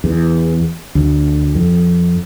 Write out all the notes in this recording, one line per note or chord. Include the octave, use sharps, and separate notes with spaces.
E2
D2
F2